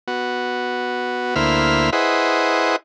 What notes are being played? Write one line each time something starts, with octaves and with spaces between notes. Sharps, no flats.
B3 F#4
D2 A#3 E4 C5 B5 F6
E4 G#4 B4 C5 D#5 F#5